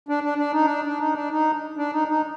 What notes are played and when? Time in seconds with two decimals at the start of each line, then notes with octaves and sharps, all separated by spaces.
0.09 D4
0.24 D4
0.38 D4
0.53 D#4
0.65 D4
0.85 D4
1.00 D#4
1.15 D4
1.31 D#4
1.77 D4
1.93 D#4
2.08 D#4